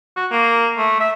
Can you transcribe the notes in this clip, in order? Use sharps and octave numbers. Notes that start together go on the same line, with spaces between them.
F#4
A#3
A3
E5